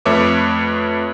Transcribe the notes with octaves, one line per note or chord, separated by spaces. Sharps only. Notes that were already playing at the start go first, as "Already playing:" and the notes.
F2 A3 B4 C#5 E5 D6